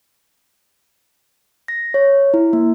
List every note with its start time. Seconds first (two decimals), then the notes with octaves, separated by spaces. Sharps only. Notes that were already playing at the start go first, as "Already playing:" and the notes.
1.68 A#6
1.94 C#5
2.34 E4
2.53 A#3